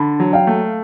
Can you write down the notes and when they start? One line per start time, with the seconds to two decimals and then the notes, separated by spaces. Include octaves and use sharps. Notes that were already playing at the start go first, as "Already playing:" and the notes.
Already playing: D3 A5 B5
0.20 F#3
0.33 F5 G5
0.47 A3